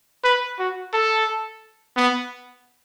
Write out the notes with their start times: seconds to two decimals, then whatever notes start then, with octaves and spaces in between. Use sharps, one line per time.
0.24 B4
0.59 F#4
0.93 A4
1.97 B3